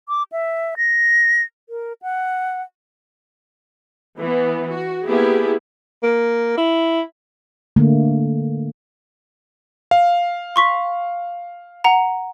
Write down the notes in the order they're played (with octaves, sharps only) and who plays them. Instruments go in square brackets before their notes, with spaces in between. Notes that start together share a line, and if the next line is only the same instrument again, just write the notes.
[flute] D6
E5
A#6
A#4
F#5
[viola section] E3 B3
F#4
A#3 B3 E4 G4 G#4
[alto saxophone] A#3
E4
[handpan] D3 A3 A#3
[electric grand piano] F5
[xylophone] C6 C#6 B6
F#5 A#5